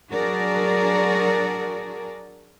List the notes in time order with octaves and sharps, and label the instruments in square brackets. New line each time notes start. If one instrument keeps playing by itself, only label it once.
[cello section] F#3 D4 F#4 G#4 A#4 D5